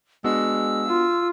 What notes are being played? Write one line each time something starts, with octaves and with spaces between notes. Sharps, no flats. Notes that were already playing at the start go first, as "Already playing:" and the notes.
G#3 B3 D4 F#4 E6
F4